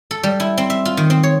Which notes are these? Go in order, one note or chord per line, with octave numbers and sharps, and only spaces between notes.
A4
G3
E4
C4
E5
F4
D#3
C4
C#5